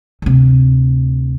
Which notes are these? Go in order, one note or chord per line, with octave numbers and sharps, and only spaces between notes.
D2 C3